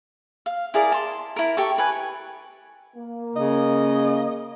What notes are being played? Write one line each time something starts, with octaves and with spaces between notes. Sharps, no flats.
F5
E4 G#4 A#4 D5
A5 C6
E4 A#4
G4 A4 C#6
B4 G#5
A#3
C#3 D#5